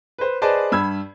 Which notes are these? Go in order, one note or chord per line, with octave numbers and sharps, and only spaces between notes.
B4 C5
G#4 B4 C5 D5 D#5 A5
G2 B5 E6 G#6